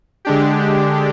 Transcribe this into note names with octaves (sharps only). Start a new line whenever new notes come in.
D3 G#3 D4 G4